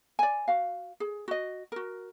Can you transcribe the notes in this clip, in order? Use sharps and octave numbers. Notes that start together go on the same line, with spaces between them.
D5 G#5
F#4 F5
G#4
F#4 D#5
F#4 A#4